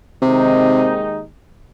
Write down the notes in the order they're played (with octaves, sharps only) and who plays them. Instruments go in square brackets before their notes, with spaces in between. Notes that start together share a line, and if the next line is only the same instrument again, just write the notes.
[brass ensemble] D#2 D#3 G#3 D#4 [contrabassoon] C3